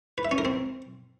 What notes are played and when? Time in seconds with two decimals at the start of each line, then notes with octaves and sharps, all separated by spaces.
0.18 B4
0.25 E5
0.31 C#4
0.38 A#4
0.45 C4